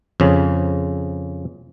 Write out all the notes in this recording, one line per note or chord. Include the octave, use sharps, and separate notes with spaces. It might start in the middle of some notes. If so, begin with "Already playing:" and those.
F2 C#3